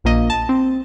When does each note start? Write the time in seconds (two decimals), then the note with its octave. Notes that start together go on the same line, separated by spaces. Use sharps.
0.04 A#1 F3 A#3 D#5
0.30 A5
0.49 C4